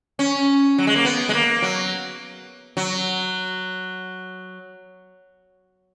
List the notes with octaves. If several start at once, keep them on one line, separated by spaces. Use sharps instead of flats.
C#4
F#3
G#3
A#3
B3
G#3
A#3
F#3
F#3